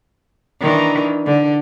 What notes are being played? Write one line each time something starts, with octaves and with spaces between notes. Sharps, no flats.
D#3 E3 D4
D3